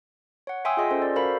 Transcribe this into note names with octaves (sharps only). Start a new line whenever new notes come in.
C#5 F#5
E5 G5 G#5 C6 D#6 E6
F4 G#4 D#5 C6
C#4 A4 C5
D5
F#4 A4 A#4 C5 F5 B5